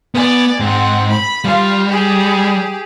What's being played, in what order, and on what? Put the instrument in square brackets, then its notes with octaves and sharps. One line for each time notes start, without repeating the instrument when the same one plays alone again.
[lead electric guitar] B3 [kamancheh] D5 G#5
[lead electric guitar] G#2 [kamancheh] C4 F#5
[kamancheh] B5
[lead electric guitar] G3 [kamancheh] F4 F5
[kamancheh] G4 G#4